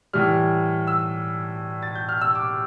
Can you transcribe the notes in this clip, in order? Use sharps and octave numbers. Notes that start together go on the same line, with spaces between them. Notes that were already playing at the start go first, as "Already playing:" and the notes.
A2 E3 G3 F6
E6
A6
G6
F6
E6
D6